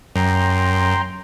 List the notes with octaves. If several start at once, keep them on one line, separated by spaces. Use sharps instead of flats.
F#2 G5 A#5 C6